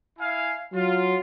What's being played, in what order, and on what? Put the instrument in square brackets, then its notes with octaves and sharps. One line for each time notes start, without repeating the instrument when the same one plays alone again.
[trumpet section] E4 F5 G#5
[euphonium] F#3 [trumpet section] F4